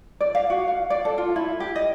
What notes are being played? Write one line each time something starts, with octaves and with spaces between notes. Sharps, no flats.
D5
F5
F#4
F5
D5
A4
F4
E4
G4
D#5